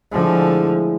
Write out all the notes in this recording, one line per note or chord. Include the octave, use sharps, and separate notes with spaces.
A2 D3 F3 G#3